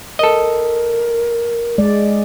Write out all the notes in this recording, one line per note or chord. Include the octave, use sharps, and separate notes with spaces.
A4 A#4 D#5
G#3 D5